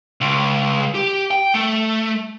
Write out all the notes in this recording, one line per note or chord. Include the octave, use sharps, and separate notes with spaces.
C#2
G4
G5
A3